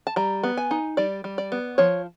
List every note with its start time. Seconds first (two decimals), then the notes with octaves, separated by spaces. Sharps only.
0.07 A5
0.16 G3 A#5
0.43 B3
0.57 G#5
0.71 D#4
0.97 G3 D5
1.24 G3
1.38 D5
1.52 B3
1.78 F3 C#5